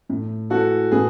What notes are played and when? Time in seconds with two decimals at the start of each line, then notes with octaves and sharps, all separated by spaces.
0.09 A2
0.50 E3 F#4 A4
0.92 A2 G#4 B4